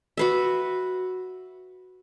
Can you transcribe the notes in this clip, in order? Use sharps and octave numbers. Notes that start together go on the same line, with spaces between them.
F#4 B4 E5